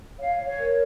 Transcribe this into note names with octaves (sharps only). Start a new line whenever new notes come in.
C#5 F5
C#5
A#4